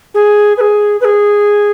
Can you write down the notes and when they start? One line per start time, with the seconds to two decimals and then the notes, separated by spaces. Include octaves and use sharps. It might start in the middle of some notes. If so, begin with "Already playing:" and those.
0.14 G#4
0.57 B4
0.61 G#4
1.01 B4
1.05 G#4